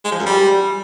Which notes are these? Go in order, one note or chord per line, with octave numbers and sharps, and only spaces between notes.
G#3
F3
F#2
G3